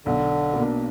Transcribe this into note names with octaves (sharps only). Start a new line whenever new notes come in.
B1 D3
B2 A#3 D4